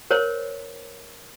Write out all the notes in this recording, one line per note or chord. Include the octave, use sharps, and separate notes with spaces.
A#4 C5 C#5